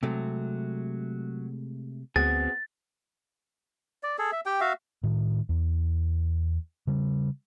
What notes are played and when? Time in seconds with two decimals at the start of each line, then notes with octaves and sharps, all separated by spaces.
0.03 C3 F#3 G#3 A3
2.16 D2 B3 C4 F#4 G#4 A6
4.03 D5
4.18 G#4 A4
4.32 E5
4.46 G4 G5
4.60 F#4 E5 F5
5.03 A2 D#3
5.49 E2
6.87 C#3 G3